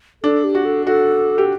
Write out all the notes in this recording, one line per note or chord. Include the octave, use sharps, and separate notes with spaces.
D4 A4
G4
F#4
A4
F#4 A4
G4